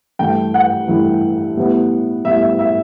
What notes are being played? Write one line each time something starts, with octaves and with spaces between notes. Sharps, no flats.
G2 E3 A3 E4 G5
F#5
G2 E3 A3 E4
A2 G3 B3 E4
A2 G3 B3 E4 E5
E5
E5